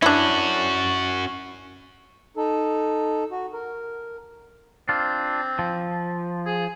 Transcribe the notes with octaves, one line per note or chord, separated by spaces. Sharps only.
C#4 D4 E4 F#4
D#4 A4
F#4
A#4
C4 D4 F4
F3
G#4